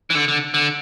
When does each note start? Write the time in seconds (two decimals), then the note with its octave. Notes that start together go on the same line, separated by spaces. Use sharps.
0.10 E3
0.15 D3
0.28 D3
0.54 D3